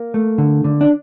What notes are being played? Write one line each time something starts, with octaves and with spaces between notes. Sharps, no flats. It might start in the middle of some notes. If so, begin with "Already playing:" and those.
Already playing: A#3
A3
D3
D3
D4